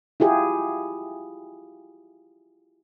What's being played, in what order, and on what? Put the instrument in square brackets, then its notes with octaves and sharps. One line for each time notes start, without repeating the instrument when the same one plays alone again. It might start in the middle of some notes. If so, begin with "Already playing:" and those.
[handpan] E4 F4 G4 G#4